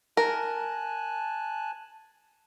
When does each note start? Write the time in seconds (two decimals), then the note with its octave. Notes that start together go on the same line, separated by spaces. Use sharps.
0.17 A#4 G#5 A5 F#6